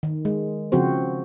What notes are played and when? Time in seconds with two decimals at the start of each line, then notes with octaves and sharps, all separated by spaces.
0.03 D#3
0.25 G#3
0.72 C#3 F3 C4 F#4 C5